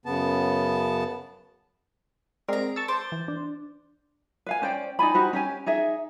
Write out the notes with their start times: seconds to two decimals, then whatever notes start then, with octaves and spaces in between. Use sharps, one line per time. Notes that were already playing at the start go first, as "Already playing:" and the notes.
0.06 F#2 C#3 B3 A5
2.48 G#3 C4 G#4 A#4 D5 A#5
2.76 A5 C#6 E6 A6
2.88 C5 A5 D6
3.12 E3
3.28 D4
4.46 B4 F5 G#5
4.62 C#4 C5 D5 G5
4.99 D#4 D5 G#5 B5
5.14 D#4 F#4 G4 C5
5.33 C#4 G4 G#5
5.66 D#4 G#4 E5